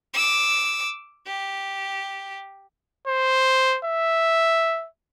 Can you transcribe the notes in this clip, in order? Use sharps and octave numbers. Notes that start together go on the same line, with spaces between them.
D6 E6
G4
C5
E5